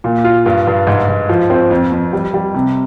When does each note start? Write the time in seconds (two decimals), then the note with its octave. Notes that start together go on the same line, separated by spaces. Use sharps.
0.04 A#2
0.24 F4
0.46 G2
0.67 G2
0.87 G#2
1.08 G#2
1.29 F3
1.50 C4
1.71 F2
1.92 F2
2.13 G3
2.34 G3
2.55 C3